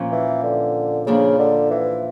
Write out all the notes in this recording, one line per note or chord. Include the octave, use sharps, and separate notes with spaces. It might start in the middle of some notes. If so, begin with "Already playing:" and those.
Already playing: A#2 F3 A#3 C#4
E3
D3
C#3 F3 A#3 D4
D3
E3